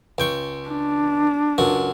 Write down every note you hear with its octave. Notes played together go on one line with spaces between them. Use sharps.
C#2 G5 C#6
D4
C#2 F#2 F#4